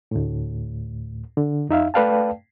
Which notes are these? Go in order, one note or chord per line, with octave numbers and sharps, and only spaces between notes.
D2 A2
D3
F2 D#4 E5 F5
A3 B4 D5 F5 G5 A5